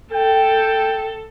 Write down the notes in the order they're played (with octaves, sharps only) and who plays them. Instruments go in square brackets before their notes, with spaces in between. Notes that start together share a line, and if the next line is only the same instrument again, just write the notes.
[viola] A4 [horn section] G5